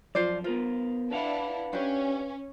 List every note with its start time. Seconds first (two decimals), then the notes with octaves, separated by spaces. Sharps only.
0.15 F#2 F3 F4 C5 D5
0.44 B3 F4 A#4 C5
1.11 D4 E4 B4 F5 F#5
1.73 C#4 D4 G4